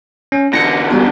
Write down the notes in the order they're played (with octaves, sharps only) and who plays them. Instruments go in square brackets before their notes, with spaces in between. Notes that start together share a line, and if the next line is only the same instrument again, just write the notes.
[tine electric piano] C#4
[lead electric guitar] E2 D3 [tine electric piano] A#6 C#7
[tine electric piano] G3 B3 F#4